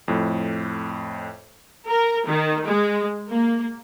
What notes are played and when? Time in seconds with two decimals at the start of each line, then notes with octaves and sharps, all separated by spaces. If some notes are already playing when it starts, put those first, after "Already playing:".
0.08 F2 A2
1.87 A#4
2.26 D#3
2.65 G#3
3.29 A#3